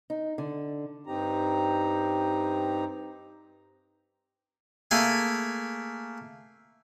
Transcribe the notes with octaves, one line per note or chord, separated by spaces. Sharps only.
D#4
D3
G2 C4 D#4 G4 A#5
A3 A#3 G#4 G#5